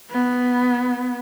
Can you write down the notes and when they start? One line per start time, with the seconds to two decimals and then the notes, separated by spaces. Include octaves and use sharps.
0.11 B3